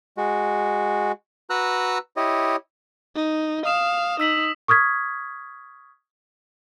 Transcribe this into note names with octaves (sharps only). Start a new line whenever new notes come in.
G#3 F#4
F#4 B4 A#5 E6 F#6
E4 G4 C#5 D#5
D#4
F5 D#6 E7
D#4 E6 B6 F#7
C#6 D#6 F6 G#6 B6